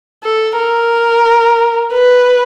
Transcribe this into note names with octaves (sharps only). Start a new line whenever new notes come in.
A4
A#4
B4